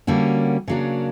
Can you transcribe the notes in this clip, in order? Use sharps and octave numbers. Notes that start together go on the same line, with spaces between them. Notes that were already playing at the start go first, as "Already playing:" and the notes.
D3 G3 A#3 C#4 F#4
C#3 F#3 A#3 D4